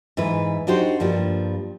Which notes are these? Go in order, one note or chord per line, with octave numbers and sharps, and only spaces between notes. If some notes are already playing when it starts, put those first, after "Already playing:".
G#2 E3 B4
D4 D#4 F#4 G4 C5
G2 F3 G3 A#3